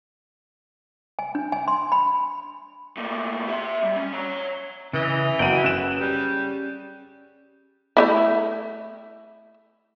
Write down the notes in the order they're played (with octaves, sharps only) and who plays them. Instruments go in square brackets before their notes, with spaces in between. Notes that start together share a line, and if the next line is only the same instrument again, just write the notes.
[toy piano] G#5
D4
G#5
C6
B5
[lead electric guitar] A2 A#3
G4 E5
G3
C#4
C#5 A#5
[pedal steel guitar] C#3 D#5 [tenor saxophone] E3
[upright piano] F#1 F#4 D#7 [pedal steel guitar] G5 B5
[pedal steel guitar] C#4 G#4 [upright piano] F#6 E7
[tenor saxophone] G3
[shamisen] A3 D#4 E4